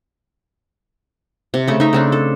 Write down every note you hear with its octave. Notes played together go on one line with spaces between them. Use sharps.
C3
C#3 A3
D#4 E5
C#3 C4 D4
A4